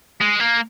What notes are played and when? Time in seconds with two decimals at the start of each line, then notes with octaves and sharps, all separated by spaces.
0.21 G#3
0.40 A#3